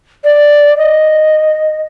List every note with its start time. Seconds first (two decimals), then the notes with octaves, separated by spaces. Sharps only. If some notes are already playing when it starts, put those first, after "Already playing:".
0.24 D5
0.78 D#5